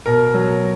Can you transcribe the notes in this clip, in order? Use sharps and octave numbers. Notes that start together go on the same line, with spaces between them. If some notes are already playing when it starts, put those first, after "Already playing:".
B2 A#4
F#3